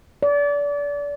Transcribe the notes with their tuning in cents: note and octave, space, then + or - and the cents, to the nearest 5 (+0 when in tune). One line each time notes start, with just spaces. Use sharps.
D5 -30